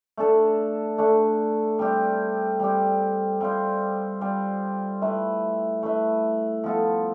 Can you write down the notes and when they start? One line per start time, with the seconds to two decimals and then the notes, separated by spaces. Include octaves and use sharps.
0.17 A3 D4 A4
0.98 A3 D4 A4
1.79 G3 C4 G4
2.60 G3 C4 G4
3.41 G3 C4 F4 C5
4.21 G3 C4 F4 C5
5.02 A3 E4 B4 E5
5.83 A3 E4 B4 E5
6.64 F3 B3 F4 A4